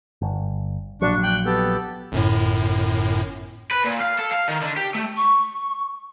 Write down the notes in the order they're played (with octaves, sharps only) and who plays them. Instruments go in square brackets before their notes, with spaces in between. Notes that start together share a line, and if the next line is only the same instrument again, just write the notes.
[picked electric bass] G1
[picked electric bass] A#1 F#3 [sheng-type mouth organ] D4 C#6
[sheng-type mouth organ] G5 F#6
B3 G4 A4
[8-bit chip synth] G1 F#2 A2
[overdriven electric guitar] B4
A#2
F5
A4
F5
D#3
D3
G4
A3
[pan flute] C#6